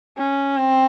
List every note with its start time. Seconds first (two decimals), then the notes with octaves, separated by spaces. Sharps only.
0.18 C#4
0.57 C4